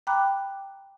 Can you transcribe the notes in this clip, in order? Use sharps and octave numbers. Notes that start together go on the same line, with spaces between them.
G5 A#5 B5 D6 F#6